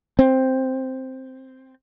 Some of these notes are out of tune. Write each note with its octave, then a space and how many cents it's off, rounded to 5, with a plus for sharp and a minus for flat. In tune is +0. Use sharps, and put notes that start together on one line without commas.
C4 +0